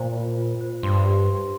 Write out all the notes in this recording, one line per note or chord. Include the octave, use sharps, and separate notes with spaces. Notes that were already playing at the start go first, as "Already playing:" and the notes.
Already playing: A#2 C5
F4
F4
C5
G2 C6
G4
C6